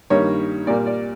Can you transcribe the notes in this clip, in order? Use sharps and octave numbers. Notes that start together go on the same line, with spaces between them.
G2 D#3 G3 A#3 C#5
A#2 G3 A#3 D5
D5